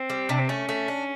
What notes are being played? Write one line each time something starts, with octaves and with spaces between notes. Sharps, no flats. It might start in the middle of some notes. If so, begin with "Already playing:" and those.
Already playing: C4
G3
C3 D4
C4
A3 C#4
A3
D4